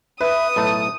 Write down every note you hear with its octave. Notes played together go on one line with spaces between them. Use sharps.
B4 E5 D#6
B1 A2 A3 A5